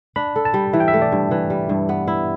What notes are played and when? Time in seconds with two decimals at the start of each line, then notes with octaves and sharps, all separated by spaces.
0.16 D4 B5
0.36 A4
0.45 A5
0.54 G3
0.73 E3 E5
0.80 G5
0.88 E5
0.93 A3
1.02 D5
1.12 G2
1.31 E3
1.50 G3
1.69 G2
1.89 B3
2.07 E4